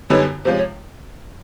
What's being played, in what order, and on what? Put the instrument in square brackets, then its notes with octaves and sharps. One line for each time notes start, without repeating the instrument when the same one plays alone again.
[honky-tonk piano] F#2 D3 G3 B3 D#4 [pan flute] C#5
[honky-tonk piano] C3 F3 G#3 C#4 [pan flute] C5
[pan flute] C#5